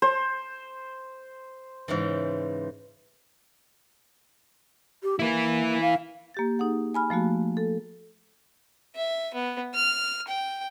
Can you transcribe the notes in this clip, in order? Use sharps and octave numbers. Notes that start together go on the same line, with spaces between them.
C5
G#2 C#3 E3
G4
A#3 E4 B4
F5
A#3 G4 A6
D#4 G#4 F#5
G#5 B5 F6
F3 A3 A#3 F#4
A4
E5
B3
F6
G5